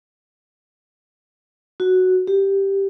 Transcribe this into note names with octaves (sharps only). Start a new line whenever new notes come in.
F#4
G4